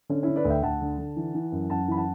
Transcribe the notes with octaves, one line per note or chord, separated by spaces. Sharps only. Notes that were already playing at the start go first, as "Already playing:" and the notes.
D3 C#4
D3 C#4 E4
B4 D5
D2
E5 G5
D2 F#5 A5
D3
D3
E3
E3
F#2
F#2 F#5 A5
E3 B5
F#5 A5